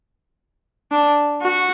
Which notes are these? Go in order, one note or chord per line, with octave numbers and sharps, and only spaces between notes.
D4
F#4